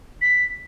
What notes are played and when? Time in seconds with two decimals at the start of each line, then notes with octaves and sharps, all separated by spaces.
0.22 B6